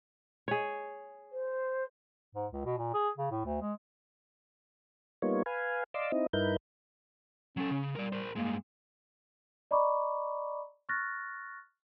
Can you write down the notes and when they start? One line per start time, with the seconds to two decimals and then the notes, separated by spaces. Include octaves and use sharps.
0.48 G#4 C#5
1.32 C5
2.35 G#2
2.52 C#2
2.65 B2
2.78 A#2
2.94 G#4
3.17 C#3
3.31 A2
3.45 D2
3.61 G#3
5.22 G3 A#3 B3 D#4 F4 C#5
5.46 B4 F5 G#5
5.94 D5 D#5 F5 C6 D6 E6
6.12 C4 D#4 E4 D#5
6.33 G2 D#4 E4 A#4 B4 G6
7.57 F#3 C#4 A4
7.71 C#3
7.95 G3 A#4 D5
8.13 A#4 C5
8.36 G2 G#3 A#3
9.71 D5 D#5 A#5 B5 C#6 D6
10.89 C#6 F6 F#6 A6 A#6